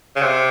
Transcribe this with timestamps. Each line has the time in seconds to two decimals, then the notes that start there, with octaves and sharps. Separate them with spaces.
0.16 C#3
0.22 C3